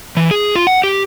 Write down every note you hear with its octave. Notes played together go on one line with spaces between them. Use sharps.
E3
G#4
F4
F#5
G4